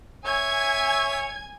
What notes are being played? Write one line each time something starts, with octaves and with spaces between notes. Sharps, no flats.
C#5 E5 G#5 G#6